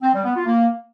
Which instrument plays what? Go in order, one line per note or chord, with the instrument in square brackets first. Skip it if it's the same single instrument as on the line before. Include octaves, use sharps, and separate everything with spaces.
[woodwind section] C4
G3
B3
F4
A#3